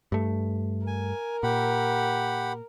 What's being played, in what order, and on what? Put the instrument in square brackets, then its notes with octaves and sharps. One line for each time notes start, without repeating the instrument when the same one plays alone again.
[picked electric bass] G2 A3
[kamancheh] A#4 [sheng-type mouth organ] G#5
[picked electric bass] A#2 [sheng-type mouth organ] G4 F#5 B5